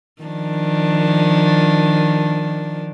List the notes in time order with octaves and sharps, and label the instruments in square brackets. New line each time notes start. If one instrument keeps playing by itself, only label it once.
[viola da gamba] D#3 F3 D4